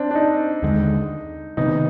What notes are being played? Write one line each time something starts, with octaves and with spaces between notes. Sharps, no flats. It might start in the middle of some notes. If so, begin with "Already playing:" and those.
Already playing: C4 D4
D4
D#4
D#2 D3 G#3
C3 D#3 B3 D#4